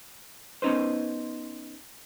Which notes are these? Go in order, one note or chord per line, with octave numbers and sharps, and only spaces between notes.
B3 C#4 D#4 B4 C5